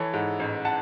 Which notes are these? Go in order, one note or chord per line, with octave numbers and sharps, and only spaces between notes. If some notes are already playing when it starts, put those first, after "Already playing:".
Already playing: E3 A4 C#5
G#2
A1
F#5 A5